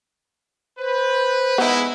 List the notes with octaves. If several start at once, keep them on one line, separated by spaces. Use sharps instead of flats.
B4 C5
G#3 B3 D#4 E4